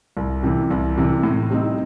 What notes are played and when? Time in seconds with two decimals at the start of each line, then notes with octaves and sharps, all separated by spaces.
0.17 C2
0.43 C3 E3
0.70 C2
0.97 C3 E3
1.23 A2
1.50 G3 C4 D#4